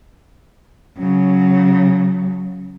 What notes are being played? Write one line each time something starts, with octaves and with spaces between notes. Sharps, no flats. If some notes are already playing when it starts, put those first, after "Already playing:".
C#3 F#3